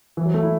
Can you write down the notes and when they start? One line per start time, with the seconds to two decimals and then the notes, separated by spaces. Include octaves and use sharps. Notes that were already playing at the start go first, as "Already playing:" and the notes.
0.17 E3
0.26 F#3
0.34 A3
0.43 E4